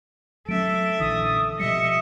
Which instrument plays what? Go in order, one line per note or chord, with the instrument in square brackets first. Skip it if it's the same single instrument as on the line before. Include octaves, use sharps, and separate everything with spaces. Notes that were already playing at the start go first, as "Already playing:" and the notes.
[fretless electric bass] F#3 A3 C#4 [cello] A4 E5 [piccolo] D7
[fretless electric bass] A#1 D3 E3 [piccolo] D#6
[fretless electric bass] B2 F3 G3 [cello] D#5 E5 [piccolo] C#7